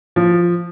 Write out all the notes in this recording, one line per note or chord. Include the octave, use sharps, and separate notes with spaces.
F3